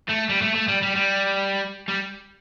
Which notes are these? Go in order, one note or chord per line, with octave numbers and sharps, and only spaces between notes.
A3
G3
A3
A3
G3
G3
G3
G3